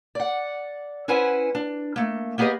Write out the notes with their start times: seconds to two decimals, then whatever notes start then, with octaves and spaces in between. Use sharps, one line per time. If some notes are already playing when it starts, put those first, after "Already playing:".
0.15 D5 F#5
1.08 C#4 E4 B4 C5 F#5 G#5
1.55 D4
1.96 A3 A#3
2.38 A#3 B3 G4 G#4 B4 D#5